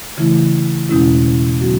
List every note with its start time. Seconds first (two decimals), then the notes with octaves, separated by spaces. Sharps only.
0.18 C#3 E3 A3 E4
0.89 E2 B2 G#3 C#4 E4
1.61 D3 F#3 B3 F#4